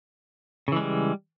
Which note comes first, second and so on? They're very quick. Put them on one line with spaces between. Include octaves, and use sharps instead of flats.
C#3 E3 G#3 G3